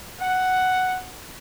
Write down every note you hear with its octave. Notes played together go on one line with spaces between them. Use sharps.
F#5